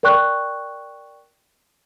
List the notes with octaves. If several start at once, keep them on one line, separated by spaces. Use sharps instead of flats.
A#4 D5 G5 C#6 F#6